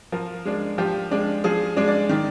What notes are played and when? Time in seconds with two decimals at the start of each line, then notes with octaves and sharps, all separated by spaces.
0.12 F3 A#4
0.45 G#3 D4
0.78 F3 G4
1.11 G#3 D4
1.44 F3 G#4
1.77 G#3 D4
1.87 D5
2.09 D#3